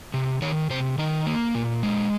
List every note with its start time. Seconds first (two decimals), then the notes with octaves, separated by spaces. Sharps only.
0.14 C3
0.42 D#3 C#5
0.70 C3 C5
0.98 D#3 A#4
1.26 A#3
1.55 A#2
1.83 G#3